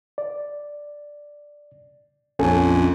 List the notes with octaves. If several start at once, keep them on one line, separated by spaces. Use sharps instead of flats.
D5
A#1 F2 C#4 A4 G#5